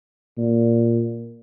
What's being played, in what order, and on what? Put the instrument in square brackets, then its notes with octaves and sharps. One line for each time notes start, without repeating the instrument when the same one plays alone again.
[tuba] A#2